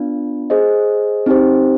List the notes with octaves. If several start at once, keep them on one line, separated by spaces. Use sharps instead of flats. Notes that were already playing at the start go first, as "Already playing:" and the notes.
Already playing: B3 D4 F4
G#4 C5 D#5
C4 D#4 G4 C5